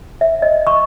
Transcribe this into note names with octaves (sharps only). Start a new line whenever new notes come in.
E5
D#5
C#6